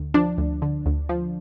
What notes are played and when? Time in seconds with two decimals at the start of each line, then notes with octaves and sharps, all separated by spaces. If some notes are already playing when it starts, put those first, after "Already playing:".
Already playing: D2
0.14 F3 D4
0.38 D2
0.62 D3
0.86 D2
1.09 F3